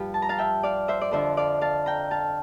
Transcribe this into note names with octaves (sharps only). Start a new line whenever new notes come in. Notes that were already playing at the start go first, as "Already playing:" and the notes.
Already playing: G2 F3 F4 G4
A5
A#5
F5 A5
E5 G5
D5 F5
C5 E5
D5
F2 D3 F3 C5 E5
D5 F5
F5 A5
G5 A#5
F5 A5